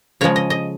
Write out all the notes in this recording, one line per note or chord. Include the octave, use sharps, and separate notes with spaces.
C#3 F3 G#3 C#5
D#5
D#5